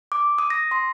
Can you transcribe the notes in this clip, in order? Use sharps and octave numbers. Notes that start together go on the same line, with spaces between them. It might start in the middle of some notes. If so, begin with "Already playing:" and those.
D6
D#6
A#6
C6